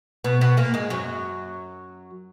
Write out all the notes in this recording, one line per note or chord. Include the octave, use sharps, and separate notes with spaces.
B2 B3
B2 B3
A#2 A#3
G#2 G#3
F#2 F#3